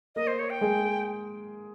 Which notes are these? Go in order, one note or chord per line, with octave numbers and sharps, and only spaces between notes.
A#3 A#4 D#5
C5
C#5
G5
G#3 G#4